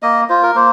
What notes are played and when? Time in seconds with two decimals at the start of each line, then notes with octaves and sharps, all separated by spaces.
0.02 A#3 D#5
0.29 F4 C5
0.43 A#4
0.56 A#3 C5